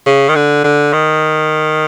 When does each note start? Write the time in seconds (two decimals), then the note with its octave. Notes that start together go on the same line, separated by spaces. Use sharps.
0.06 C#3
0.29 D#3
0.35 D3
0.64 D3
0.93 D#3